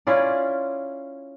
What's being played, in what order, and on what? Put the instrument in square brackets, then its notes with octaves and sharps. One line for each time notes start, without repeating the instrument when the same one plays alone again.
[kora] C#4 E4 F4 D5